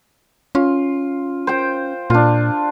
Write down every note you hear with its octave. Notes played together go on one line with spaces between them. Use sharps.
C#4 F4
C5 G5
A#2 D4 F4